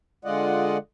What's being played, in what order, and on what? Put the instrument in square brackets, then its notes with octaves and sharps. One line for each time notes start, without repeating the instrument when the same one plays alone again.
[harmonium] D3 G#3 F4 D5 D#5 F#5